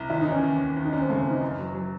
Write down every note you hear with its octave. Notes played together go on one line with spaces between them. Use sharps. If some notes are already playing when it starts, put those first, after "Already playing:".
Already playing: C2
D#2 E4
D#4
E3 C#4
D#2
D#2
D#2
D#4
D#2 C#4
C4
C#3 A3
C4
E3 D#4
F#1
F#3
F#3